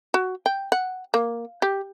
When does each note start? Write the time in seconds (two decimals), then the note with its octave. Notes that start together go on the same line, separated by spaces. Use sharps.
0.14 F#4
0.46 G5
0.72 F#5
1.14 A#3
1.62 G4